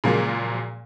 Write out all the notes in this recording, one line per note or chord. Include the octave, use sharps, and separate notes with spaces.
A#2 C#3 F3 F#3 G#3 A#3